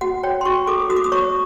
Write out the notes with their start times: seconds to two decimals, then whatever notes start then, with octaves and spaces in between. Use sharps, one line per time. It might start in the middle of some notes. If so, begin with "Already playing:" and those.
0.01 F#4 F#5
0.23 C#5 G5
0.41 C6
0.45 F#4 C#6
0.67 A4 D6
0.89 F#4 D#6
0.96 D6
1.04 D#6
1.12 C#5 C#6